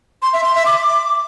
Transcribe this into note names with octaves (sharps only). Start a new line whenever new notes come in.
C6
E5
C6
E5
D6